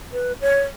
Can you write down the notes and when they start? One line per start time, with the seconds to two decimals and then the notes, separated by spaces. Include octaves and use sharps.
0.12 B4
0.41 C#5